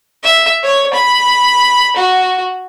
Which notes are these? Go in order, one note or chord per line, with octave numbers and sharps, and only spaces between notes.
E5
C#5
B5
F#4